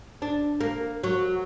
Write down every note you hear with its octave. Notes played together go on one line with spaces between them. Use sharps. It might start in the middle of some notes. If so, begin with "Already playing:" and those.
D4
A#3
F#3